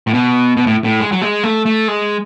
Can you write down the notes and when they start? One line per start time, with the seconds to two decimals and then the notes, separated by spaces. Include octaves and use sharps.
0.07 A2
0.14 B2
0.57 B2
0.67 A2
0.84 A2
1.00 G#3
1.12 F#3
1.22 G#3
1.43 A3
1.66 A3
1.88 G#3